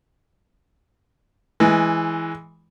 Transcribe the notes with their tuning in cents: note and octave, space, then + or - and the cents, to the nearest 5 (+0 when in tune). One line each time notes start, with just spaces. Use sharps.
E3 -5 G#3 +10